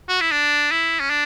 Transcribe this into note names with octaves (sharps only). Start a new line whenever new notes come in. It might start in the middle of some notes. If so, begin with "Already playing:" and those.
F#4
E4
D4
E4
C#4
D4